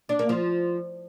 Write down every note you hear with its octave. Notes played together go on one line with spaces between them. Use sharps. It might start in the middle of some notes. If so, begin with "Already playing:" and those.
D4
A#3
F3